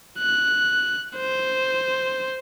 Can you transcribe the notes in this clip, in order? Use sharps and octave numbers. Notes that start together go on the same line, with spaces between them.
F#6
C5